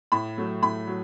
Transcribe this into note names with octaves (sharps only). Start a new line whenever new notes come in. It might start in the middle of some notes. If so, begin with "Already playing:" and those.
A2 B5
F#3 A3
A2 B5
F#3